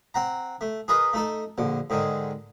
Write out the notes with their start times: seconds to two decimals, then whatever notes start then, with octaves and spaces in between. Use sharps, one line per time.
0.14 C4 F#5 A#5
0.61 A3
0.88 G#4 A#4 B4 D#5
1.13 A3 D#4 A4
1.58 A#1 D3
1.90 G#2 D3 D#3 G#3